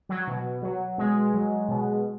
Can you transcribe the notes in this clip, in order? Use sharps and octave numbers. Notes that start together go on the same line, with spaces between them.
F#3
B2
F#3
B2 G#3
F#3
B2